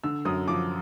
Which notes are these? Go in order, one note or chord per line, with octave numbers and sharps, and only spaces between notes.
D3 E6
F#2 D#6
F3 D6